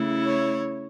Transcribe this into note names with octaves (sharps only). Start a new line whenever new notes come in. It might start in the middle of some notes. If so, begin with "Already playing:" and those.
Already playing: C#3 A3 E4
C#5